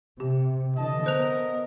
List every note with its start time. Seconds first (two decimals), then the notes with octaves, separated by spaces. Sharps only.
0.20 C3 G4
0.76 D3 E3 D#5 A5
1.06 B3 A#4 C5 F#6 F7